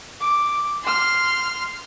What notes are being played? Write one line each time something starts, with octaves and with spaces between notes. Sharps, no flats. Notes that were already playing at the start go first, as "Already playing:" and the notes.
D6
C6 F6